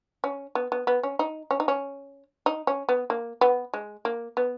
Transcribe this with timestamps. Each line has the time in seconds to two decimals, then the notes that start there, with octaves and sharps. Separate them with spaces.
0.24 C#4
0.55 B3
0.72 B3
0.87 B3
1.03 C#4
1.19 D#4
1.51 C#4
1.60 D#4
1.68 C#4
2.46 D#4
2.67 C#4
2.89 B3
3.10 A#3
3.41 B3
3.74 G#3
4.05 A#3
4.37 B3